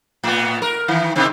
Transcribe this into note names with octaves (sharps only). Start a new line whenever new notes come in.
A2 B3
A#4
D#3 E3
C3 D#3 C4